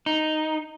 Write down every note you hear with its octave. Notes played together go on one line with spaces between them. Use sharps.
D#4